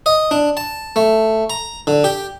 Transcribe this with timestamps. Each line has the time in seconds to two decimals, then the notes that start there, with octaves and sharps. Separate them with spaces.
0.06 D#5
0.31 D4
0.57 A5
0.96 A3
1.50 A#5
1.87 D3
2.04 G4